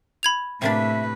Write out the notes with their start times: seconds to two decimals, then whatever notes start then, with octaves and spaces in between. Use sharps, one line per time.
0.23 B5 G#6 F7
0.62 A2 C3 A#3 D4 B4 E5